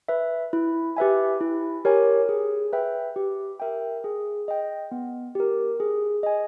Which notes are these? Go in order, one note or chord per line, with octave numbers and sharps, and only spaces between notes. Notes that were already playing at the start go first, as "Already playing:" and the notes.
B4 E5
E4
G4 B4 E5 G#5
E4
G4 A#4 C#5 G#5
G#4
B4 E5 G5
G4
A#4 E5 G5
G#4
D#5 G5
B3
G4 A#4
G#4
D#5 G#5